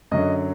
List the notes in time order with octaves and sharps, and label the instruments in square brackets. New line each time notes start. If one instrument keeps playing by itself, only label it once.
[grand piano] F#2 D3 F#3 D#5